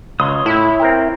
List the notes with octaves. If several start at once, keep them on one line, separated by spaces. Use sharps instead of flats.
C#2 C#5 C6 D#6
A2 E4
C4 A#4 G5